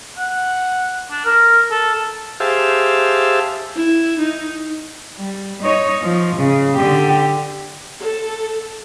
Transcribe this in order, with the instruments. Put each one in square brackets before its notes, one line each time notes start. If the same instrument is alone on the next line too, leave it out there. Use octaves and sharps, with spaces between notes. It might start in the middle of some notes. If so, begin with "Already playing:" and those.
[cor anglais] F#5
D4
A#4
A4
[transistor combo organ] G4 G#4 C5 E5 F5 A5
[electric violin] E4
D#4
[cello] G3
D#4 C#5
F3
C#3
D3 G4
[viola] A4